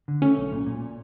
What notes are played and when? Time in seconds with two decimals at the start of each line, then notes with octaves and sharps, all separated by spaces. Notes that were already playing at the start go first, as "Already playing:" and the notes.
0.08 D3
0.22 A3 C#4
0.37 B1
0.52 A#2
0.67 A#2